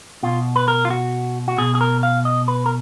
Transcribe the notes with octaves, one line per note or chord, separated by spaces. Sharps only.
B2 F4
B4
A#4
F4
F#4
F#4
B2 G#4
G#4
A#4
F5
D#5
B4
A#4